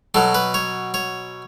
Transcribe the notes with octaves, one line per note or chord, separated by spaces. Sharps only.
B2 F#3 A4
B4
C#5
C#5